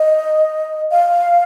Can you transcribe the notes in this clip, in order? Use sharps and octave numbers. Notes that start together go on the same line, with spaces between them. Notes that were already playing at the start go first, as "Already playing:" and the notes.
Already playing: D#5
F5